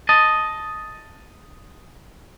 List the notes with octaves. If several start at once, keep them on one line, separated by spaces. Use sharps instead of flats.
D#5 A5